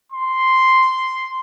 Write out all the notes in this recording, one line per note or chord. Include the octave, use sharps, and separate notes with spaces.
C6